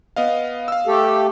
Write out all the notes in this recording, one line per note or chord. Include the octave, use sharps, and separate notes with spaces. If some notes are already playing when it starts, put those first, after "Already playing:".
B3 D#5 F5
F5 E6
A3 G4 A4